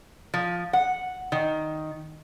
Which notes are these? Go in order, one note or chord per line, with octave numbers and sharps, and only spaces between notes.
F3
F#5
D#3